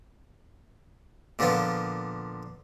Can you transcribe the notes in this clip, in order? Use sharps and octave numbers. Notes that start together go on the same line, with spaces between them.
A#2 D3 F3 B3 F4